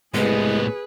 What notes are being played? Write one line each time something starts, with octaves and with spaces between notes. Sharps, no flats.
C2 A2 G#3 B3 G#4 B4